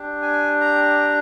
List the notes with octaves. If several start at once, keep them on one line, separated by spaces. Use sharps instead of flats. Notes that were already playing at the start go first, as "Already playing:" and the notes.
Already playing: D4 G4
G#5
A#5